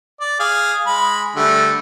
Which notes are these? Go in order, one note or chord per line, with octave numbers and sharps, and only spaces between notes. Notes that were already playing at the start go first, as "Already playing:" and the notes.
D5
G#4 F5
G#3 B5
D3 G3 A3